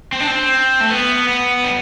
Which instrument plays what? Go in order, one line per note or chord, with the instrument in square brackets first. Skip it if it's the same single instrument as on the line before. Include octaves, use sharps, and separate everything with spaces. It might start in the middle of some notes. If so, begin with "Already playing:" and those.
[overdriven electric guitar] C4
D4
C4
A3
B3
B3
G3